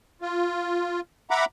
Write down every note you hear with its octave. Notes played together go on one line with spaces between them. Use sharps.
F4
E5 F#5 A#5 B5 D6